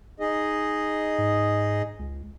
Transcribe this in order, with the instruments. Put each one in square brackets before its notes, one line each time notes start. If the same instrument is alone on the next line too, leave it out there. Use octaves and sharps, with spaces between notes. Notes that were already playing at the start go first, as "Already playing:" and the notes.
[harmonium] D#4 G#4 D#5
[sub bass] G#2
C#2